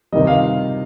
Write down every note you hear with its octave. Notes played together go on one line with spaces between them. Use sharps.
C3 D#3 G3 D#5
F5